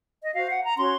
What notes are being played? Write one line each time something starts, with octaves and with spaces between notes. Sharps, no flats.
D#5
F#4 C5 F5
F#5
A#5
C#4 F#4 C#5 C6